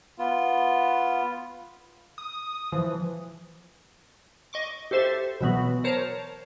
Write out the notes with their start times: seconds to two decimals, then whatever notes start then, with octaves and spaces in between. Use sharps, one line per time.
0.18 B3 F4
2.18 D#6
2.72 E3 F3
4.53 D#5 C#6 D6
4.91 G4 A4 C5 E5
5.41 B2 E3 F#3 B3 F#4
5.84 A#4 C5 C#5 A5 A#5